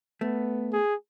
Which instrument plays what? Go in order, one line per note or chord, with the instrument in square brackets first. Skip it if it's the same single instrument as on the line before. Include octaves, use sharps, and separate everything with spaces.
[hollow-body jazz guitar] A3 [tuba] B3
[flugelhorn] G#4